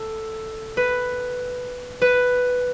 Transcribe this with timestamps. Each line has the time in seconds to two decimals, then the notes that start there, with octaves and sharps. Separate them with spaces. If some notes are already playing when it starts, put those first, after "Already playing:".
Already playing: A4
0.77 B4
2.02 B4